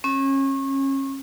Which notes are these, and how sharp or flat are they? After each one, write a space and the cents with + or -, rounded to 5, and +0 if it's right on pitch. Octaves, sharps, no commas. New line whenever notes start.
C#4 -30